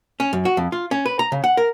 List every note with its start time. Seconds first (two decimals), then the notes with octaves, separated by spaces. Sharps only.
0.20 C#4
0.33 F#2
0.45 F#4
0.57 F2
0.72 F4
0.91 C#4
1.06 B4
1.19 A#5
1.32 C#3
1.44 F#5
1.57 A#4